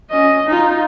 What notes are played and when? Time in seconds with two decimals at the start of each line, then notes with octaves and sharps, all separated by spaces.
0.11 C#4 D#5
0.47 D#4 F4